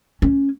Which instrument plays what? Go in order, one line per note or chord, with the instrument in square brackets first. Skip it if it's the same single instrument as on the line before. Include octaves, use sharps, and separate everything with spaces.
[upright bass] C#4